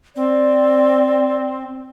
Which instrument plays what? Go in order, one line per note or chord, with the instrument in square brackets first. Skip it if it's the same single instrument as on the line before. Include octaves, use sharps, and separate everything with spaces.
[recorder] C4 [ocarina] D5